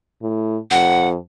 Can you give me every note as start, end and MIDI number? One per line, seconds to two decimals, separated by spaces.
0.22 0.57 45
0.71 1.16 41
0.71 1.08 78